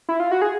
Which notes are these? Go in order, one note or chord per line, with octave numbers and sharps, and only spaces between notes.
E4
F4
F#4
G#4